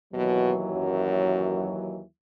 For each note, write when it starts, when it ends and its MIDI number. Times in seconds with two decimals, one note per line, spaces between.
0.14 2.02 39
0.14 0.52 47
0.14 2.02 52
0.14 2.02 54
0.72 1.69 42